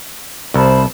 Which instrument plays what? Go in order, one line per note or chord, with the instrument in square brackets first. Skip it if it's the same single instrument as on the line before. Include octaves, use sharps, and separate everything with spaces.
[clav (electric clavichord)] C2 [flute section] C5 A5 B5